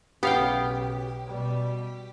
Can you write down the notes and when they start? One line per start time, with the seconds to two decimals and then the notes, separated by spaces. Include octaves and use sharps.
0.23 B1 C#3 B3 G4 F5 G5
1.27 B2 G3